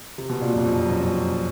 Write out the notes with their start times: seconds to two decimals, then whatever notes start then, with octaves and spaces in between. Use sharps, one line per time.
0.18 C3
0.29 B2
0.41 A#2
0.54 F#2
0.65 F2
0.90 F#2